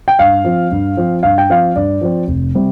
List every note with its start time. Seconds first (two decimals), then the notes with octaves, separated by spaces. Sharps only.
0.08 G5
0.19 G2 F5
0.44 F3 C4
0.71 G2
0.97 F3 C4
1.23 G2 F5
1.38 G5
1.50 F3 C4 F5
1.76 G2 D5
2.01 F3 C4
2.27 F1
2.54 C3 G3 C4